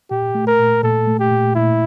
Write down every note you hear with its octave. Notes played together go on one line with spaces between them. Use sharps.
A#2 G4
A3
A#4
A#2
A#2 A4
A3
G4
A#2
A#2 E4